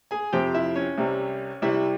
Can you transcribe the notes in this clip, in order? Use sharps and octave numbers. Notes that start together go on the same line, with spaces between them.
G#4 G#5
F2 C3 F3 C4 G4 G5
E4 E5
C#4 C#5
C2 C3 G3
C2 C3 G3 E4 E5